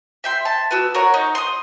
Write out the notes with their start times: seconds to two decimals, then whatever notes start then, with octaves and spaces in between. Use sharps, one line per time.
0.24 E5 G5 C6
0.45 A5
0.71 B3 F#4 E6
0.94 A#4 C#5 F#5
1.14 D#4
1.35 C6 D#6